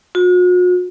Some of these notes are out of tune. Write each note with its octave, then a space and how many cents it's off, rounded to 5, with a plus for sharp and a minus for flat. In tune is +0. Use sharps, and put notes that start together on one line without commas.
F#4 -45